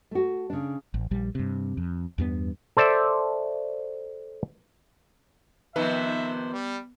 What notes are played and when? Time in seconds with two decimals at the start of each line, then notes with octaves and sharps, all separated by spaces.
0.11 A3 F#4
0.50 C#3 D4
0.94 A1
1.11 A#1 G3
1.35 G2 C3
1.77 F2
2.18 E2 G2 B3
2.77 A4 C5 D5 E5
5.76 C3 D#3 F3 B3 B4 E5
6.53 G3